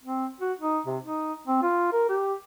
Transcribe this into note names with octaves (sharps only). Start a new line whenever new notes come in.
C4
F#4
D#4
C3
D#4
C4
F4
A#4
G4